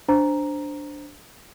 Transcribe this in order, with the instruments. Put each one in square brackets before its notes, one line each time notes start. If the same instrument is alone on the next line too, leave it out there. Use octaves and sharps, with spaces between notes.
[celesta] D4 C5 A#5